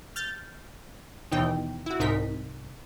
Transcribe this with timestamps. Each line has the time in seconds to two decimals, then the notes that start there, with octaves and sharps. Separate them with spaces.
0.16 F6 G6 A6
1.32 D#2 B2 E3 D#4 G5
1.86 E4 F#4
2.00 C2 G#2 D#4 A#4 B6